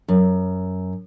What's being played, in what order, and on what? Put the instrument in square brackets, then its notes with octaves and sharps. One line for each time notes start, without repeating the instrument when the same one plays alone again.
[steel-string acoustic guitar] F#2